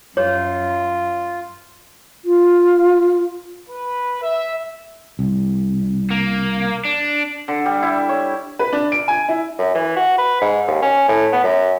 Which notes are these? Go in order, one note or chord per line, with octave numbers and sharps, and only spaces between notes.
F#2 F4 C#5
F4
B4
E5
C2
A#3
D4
D3
G3
E4
C#5
B4
D4
D7
G#5
E4
F#2
E3
F#4
B4
G#2
D#2
C#4
A2
B3
F#2